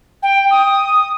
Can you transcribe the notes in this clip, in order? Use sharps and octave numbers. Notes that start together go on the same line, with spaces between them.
G5
D#6